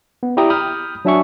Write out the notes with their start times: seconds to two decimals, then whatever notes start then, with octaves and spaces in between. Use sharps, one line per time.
0.23 B3
0.37 E4 G4 D5 G5 A#5 D#6
0.50 B5 D#6 F6 G6
1.05 F#3 D4 F#4 E5 G#5 C#6